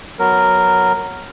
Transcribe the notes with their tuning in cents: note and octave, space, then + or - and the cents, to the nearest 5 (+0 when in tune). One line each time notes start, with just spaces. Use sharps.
F#3 +0 B3 +0 A#4 -5